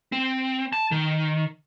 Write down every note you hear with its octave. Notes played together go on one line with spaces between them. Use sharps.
C4
A5
D#3